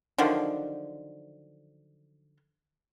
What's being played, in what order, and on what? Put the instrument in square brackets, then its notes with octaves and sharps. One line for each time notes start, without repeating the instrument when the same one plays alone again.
[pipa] D3 D#3 F3 F#3